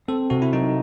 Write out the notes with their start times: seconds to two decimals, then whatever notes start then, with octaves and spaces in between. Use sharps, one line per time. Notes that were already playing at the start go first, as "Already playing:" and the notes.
0.08 C4 A4
0.30 C3 F#4
0.42 E4
0.53 F#3 D#4